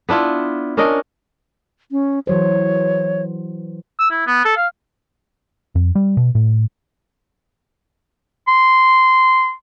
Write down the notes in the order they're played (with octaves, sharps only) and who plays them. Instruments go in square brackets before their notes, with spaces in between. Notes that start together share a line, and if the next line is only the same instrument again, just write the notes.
[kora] B3 D4 E4 F4
C#4 D4 A#4 D#5
[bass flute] C#4
[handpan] E3 F#3 C5 [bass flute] C#5
[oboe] E6
E4
B3
A4
F5
[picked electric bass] F2
G3
B2
A2
[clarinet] C6